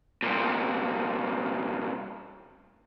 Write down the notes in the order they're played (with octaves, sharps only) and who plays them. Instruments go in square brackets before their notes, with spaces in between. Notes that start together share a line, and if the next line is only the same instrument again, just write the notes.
[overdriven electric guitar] C2 A#2